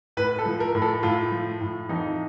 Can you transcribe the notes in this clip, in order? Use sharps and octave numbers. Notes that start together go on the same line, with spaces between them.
A2 B4
A4
F3
A#4
A2
A4
A2 F4
F3
A2
F2 D#4